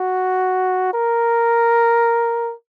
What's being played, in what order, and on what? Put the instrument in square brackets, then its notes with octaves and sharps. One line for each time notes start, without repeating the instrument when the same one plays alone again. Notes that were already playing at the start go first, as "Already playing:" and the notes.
Already playing: [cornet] F#4
A#4